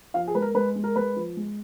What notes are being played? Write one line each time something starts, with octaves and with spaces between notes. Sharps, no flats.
F3 F5
G#4
G#3 B4
A#4
G#3 B4
G#3
A#4
G#3 B4
F3
G#3